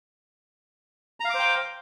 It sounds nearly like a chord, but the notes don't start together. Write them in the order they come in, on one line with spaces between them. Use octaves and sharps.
A#5 F5 D6 C5 G5